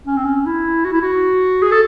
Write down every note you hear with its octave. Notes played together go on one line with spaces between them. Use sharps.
C#4
C4
C#4
E4
F#4
E4
F#4
G#4
A4